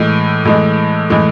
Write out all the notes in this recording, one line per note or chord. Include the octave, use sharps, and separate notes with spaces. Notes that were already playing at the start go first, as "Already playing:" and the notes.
Already playing: A2 E3 G#3
A2 E3 G#3
A2 E3 G#3